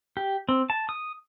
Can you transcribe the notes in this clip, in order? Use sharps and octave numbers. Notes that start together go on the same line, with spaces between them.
G4
C4
A5
D#6